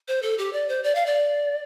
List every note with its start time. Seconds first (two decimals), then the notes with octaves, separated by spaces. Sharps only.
0.08 C5
0.22 A4
0.38 G4
0.53 D5
0.69 C5
0.84 D5
0.95 F5
1.06 D5